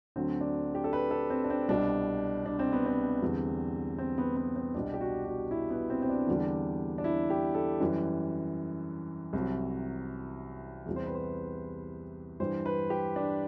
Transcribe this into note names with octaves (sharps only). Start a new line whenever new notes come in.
D2 D3 F#3 C4
D4
G4
A4
B4
A4
C4
D4
C4
C2 B2 G3 D4
D4
C4
B3
C4
E2 D3 G3
C4
B3
B3
C4
C2 B2 G3 D4
G4
F#4
F#4
E4
B3
C4
C4
D4
E2 D3 G3
D4
E4
G4
A4
F#2 E3 G3
C2 C3 F#3
E2 C3 G3
C5
B4
C5
G2 E3 G3 C5
B4
G4
D4